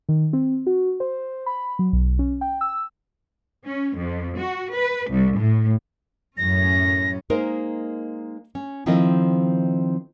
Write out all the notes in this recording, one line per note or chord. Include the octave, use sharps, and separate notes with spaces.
D#3
C4
F#4
C5
B5
F#3
B1
C#4
G5
E6
C#4
F2
F#4
B4
C2
A2
F#2 A2 C#4 A#6
G#3 A#3 D#4 A#4 C5
C#4
D#3 F3 C4 E4 A4 D#5